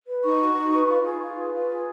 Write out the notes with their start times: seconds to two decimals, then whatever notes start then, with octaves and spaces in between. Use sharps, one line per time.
0.08 B4
0.24 D#4 C#6
0.41 F#4
0.56 D#4
0.73 B4
0.89 F4
1.05 G#4
1.21 F4
1.37 B4
1.53 F4
1.69 G#4